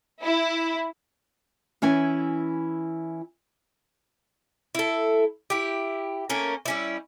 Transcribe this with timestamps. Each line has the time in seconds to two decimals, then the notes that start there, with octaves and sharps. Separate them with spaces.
0.22 E4
1.82 E3 C#4 E4 G#5
4.75 E4 A4
5.50 E4 G4
6.29 A3 A#3 C#4 A#4
6.65 G3 C#4 E4